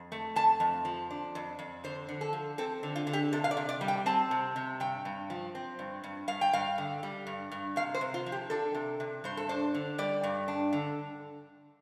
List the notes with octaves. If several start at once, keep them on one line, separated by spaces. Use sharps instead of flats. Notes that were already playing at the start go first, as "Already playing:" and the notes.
Already playing: F2
A3
F2 A5
F2
F3
D4
F2
F2
D3 C5
D3
A4
F3
C4 A4
D3
F4
D3
G4
C3 A4
F5
D5
C3
D5
G3
G5
C4 A5
C3
C3
G2 G5
G2
F3
C4
G2
G2
G2 F5
G5
G2 F5
D3
G3
G2
G2
C3 F5
C5
C3
F4
F3
G4
D4 A4
C3
C3
G2 C5
A4
D4 C5
D3
G3 D5
G2
D4
D3